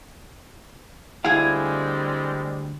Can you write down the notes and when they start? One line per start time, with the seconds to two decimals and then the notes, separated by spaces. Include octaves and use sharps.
1.25 D2 G3 G#3 C4 E4 G#4 F5 F#5